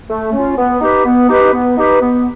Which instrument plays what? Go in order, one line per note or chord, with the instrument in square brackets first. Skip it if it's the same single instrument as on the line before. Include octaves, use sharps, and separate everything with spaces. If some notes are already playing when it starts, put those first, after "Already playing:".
[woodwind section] A3
C#4 F4
B3
D#4 G4 B4
B3
D#4 G4 B4
B3
D#4 G4 B4
B3